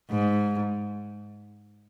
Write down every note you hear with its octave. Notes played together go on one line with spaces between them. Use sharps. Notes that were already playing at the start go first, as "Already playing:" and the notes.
G#2